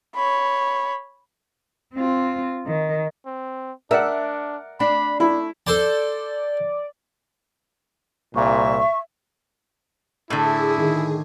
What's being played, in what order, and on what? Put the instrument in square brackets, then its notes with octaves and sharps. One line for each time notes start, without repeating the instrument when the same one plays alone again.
[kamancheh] C#5 B5
[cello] C4 F4
D#3
[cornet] C4
[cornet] D4 [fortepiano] A#4 D5 F#5 [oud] E5
[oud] D4 [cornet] B5
[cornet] A3 [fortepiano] E4 B5
[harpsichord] A4 C5 A5 [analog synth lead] D5
[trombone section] C2 A#2 [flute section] E5 C#6
[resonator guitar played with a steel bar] A2 D3 [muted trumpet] E4 [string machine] G#4
[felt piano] D#3